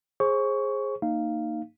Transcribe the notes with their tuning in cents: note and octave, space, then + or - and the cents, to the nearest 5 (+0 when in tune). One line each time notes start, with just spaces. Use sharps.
G#4 +0 C5 +30 C#6 +15
A#3 -15 D#4 -10 F5 -10